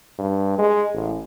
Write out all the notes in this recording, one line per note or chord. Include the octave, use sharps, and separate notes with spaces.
G2
G#3
A1